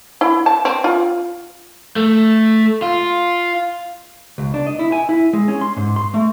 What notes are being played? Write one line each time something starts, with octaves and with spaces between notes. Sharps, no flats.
E4
A5
C4
F4
A3
F4
C#2
D4
D#5
E4
G#5
E4
G#3
C#4
C6
G#2
C6
A3